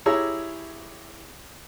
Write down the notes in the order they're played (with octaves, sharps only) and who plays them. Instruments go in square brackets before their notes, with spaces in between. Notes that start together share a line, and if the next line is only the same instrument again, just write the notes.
[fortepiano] E4 G4 G#4 C#5 A#5 E6